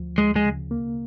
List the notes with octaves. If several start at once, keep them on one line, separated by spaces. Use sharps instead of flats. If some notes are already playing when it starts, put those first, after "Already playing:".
Already playing: D2 F3
D2 G#3
G#3
C#3
A#3